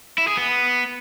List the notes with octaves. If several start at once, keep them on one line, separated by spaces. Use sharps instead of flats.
E4
G#4
B3